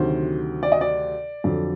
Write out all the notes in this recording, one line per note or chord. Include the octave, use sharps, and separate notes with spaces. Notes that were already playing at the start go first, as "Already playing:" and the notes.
Already playing: D2 C3 D#3 F#3 C5
D5
D#5
D5
F2 D3 F#3